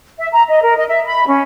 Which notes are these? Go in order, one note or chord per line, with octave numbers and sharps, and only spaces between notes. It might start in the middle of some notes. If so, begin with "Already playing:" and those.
E5
A#5
D#5
A#4
D#5
E5
B5
C#4